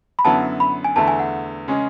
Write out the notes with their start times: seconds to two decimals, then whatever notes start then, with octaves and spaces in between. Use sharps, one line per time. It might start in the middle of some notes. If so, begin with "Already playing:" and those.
0.19 B5
0.24 F#2 D3 F#3 B3 E4 A5
0.60 B5
0.84 G#5
0.96 E2 D3 A3 E4 A5
1.08 G#5
1.20 F#5
1.68 C#3 G#3 C#4